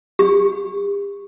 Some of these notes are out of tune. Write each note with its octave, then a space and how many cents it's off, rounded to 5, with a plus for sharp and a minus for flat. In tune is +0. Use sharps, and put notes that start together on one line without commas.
G4 +40